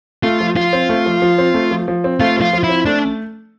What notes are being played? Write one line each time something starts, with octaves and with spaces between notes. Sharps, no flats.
A3 F4
F3
F3 F4
C4
A3
F3
F3
C4
A3
F3
F3
C4
A3 F4
F3 F4
F3
E4
C4
A3 D4